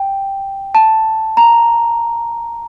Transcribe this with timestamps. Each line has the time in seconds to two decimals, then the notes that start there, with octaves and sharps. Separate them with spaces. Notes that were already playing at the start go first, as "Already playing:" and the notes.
Already playing: G5
0.75 A5
1.37 A#5